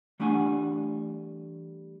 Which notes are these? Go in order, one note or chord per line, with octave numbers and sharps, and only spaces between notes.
E3 G3 A3 D4 F#5 G#5